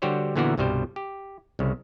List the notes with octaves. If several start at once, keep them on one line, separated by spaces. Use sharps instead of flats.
D3 G3 F#4 G4 C5 C#5
A#2 D3 E3 B3 F#4 A#4
C2 G2 B2 G3 C5
G4
C2 C#3